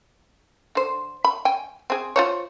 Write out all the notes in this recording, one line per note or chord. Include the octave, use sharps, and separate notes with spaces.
D3 C5
B5
G5 G#5
C4 G#4
F4 C5 C#5